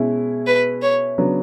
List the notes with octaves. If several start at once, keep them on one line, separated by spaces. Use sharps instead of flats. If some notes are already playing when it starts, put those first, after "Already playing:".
Already playing: B2 G#3 C#4 E4
B4
C#5
C#3 F#3 B3 D4